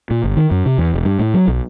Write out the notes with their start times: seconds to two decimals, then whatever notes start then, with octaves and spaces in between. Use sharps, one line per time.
0.11 A#2
0.24 G1
0.37 D#3
0.51 F#2
0.66 C3
0.78 E2
0.94 E1
1.05 G2
1.19 A2
1.34 F#3
1.48 B1